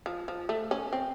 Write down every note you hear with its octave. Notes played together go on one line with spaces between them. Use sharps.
F3
F3
A3
C#4
C4